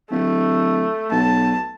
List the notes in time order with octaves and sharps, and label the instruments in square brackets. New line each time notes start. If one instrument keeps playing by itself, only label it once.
[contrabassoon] D1 [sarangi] A3
[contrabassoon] B1 [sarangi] A5